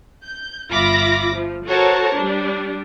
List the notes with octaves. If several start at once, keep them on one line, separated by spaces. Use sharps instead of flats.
G6
G1 F4 E5 B5 D6 A#6
F3
F#4 A4 A#4 C5 C#5 A5
G3 D4